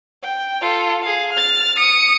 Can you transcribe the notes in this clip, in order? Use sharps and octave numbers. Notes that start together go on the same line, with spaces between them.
G5
F4 A4
G#4 F5
F6 A6
D#6 C#7